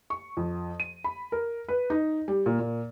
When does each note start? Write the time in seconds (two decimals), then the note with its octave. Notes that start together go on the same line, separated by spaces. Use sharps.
0.10 C#6
0.37 F2
0.80 D#7
1.04 B5
1.32 A#4
1.68 B4
1.90 D#4
2.28 G3
2.46 A#2
2.60 A#2